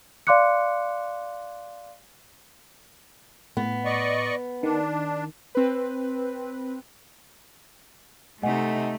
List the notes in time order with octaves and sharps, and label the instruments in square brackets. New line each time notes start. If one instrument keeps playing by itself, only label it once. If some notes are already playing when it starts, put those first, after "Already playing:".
[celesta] D5 F5 C6 D6 F#6 C#7
[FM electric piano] A2 [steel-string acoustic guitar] B3
[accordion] D5 D#5 C#6
[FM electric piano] D#3 [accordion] D4
[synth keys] C4 B4
[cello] C3 D#4 [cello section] A3 [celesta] D#5 F#5 G#5